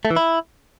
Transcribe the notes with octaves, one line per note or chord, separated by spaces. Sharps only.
A3
E3
E4